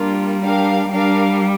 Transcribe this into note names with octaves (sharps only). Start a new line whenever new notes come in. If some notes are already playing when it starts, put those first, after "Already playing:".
Already playing: G3 A#3 D4 F4
D4 G4 A#4 F5
G3 D4 A#4 F5